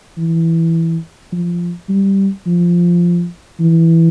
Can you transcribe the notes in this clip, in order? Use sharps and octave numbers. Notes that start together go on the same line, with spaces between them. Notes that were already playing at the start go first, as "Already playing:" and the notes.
E3
F3
G3
F3
E3